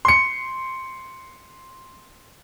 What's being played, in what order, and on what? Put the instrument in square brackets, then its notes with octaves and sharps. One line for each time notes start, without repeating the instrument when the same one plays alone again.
[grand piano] C6 C#7